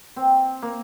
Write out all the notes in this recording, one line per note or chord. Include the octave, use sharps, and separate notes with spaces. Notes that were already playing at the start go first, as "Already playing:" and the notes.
C4
A#3